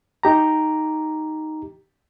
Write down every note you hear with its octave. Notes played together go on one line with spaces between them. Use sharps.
D#4 G4 A#5